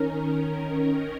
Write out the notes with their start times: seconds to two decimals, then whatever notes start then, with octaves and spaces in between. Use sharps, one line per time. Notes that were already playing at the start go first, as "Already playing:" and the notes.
Already playing: D#3 C#4 A#4
0.36 D#3 C#4 A#4